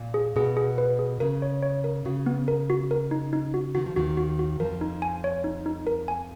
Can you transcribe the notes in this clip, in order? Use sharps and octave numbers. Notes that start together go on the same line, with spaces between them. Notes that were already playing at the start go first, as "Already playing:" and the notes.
Already playing: A#2
G#4
B2 G#4
G#4
B4
G#4
C#3 A#4
C#5
C#5
A#4
C#3 F#4
B3
A#4
F#4
A#4
D#4
D#4
F#4
D#3 F#4
F3
D#2 D#3 F#4
F#4
F#4
F2 F3 A#4
D#4
G#5
C#5
D#4
D#4
A#4
G#5